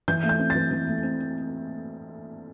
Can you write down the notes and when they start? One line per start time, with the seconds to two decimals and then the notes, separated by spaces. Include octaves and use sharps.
0.08 E3 G6
0.23 A3
0.29 G6
0.39 C4
0.50 A6
0.55 E3
0.71 E3
0.87 A3
1.03 C4